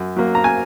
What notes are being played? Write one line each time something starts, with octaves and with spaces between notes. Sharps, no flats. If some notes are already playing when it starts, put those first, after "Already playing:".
Already playing: F#2
F#3 A#3
A#5
G#5